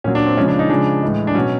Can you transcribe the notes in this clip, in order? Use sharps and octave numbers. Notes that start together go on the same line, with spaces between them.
A#2 F#3 C#4
D4
C4
C#3 F3 G#3 C#4
D4
D#4
C#3 F3 G#3 D4
A2 E3 G#3
D4
B2 F#3 C#4